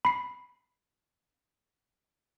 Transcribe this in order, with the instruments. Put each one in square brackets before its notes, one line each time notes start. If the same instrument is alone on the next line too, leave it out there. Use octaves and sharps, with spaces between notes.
[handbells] B5 C7